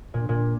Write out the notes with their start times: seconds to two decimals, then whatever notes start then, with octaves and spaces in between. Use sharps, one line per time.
0.14 A#2
0.29 A#2